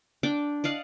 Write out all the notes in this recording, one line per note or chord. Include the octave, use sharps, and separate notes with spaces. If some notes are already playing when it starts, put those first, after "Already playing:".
D4 G5 D6
D5 D#5 F5 F#5